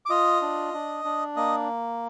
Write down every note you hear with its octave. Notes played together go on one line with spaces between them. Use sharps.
D6
F4 D#5 D#6
D4
D4
D4
A#3 D#5 D#6